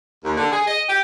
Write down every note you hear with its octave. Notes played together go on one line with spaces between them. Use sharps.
D#2
D3
G#4
D#5
G4